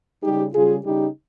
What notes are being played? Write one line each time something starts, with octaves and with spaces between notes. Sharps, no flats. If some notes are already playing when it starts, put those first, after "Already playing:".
C#3 G3 D#4 G4
C#3 G3 F4 G#4
C#3 G3 D#4 G4